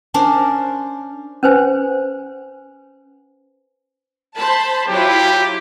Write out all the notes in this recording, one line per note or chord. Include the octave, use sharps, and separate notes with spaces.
C#4 D4 A#4 C5
C#4 B4 C5 G#5
C5 A5 B5
F#3 E4 F4 G4